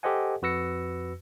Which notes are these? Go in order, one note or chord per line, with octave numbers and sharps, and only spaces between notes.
G4 A4 C5 D#5 F#5 G#5
F2 F#4 B4 E6 A#6 C#7